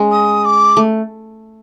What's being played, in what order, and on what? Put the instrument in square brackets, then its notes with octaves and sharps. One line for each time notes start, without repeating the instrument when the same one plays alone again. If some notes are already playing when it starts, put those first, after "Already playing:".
Already playing: [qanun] G#3 C#4
[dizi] D#6
D6
[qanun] A3